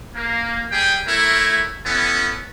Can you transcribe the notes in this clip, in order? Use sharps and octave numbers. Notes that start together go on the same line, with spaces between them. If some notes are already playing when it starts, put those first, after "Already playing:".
A#3
G3 G#4 G5
A3 E4 A#4 C#5
B3 C#4 E4 A4